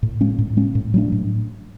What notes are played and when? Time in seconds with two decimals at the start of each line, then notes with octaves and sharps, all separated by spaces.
0.03 A2
0.21 G#3 C#4
0.39 A2
0.57 G#3 C#4
0.75 A2
0.94 F#3 A3 D4
1.12 A2